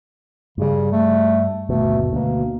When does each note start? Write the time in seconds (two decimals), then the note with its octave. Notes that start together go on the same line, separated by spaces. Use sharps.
0.58 G2 C#3 G3
0.93 A3
1.69 G1 D#2 B2 A3
2.13 D2 B2 A#3